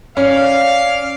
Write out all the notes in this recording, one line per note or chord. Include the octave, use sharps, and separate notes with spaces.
C#4 D5 F5